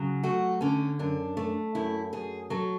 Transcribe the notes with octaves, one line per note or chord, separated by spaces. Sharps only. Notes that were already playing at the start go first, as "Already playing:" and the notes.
Already playing: C#3 F#3
A3 F#4
D3 C#4
F#2 D4
A3
F#2 E4
F#2 G#4
F#3 A4